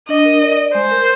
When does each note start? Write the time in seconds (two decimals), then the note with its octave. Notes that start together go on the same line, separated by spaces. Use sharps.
0.09 D4 D#5
0.25 A#4
0.42 D5
0.58 D5
0.74 G#3 C5
0.91 A#4